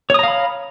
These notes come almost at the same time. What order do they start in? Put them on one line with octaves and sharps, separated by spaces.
C#5 D#6 A#5 F5 B5